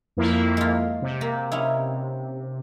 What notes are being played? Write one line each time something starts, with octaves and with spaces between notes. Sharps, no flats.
F2 A#3 E4
G#3 F4
C3
A#3
C#4 D#4 E4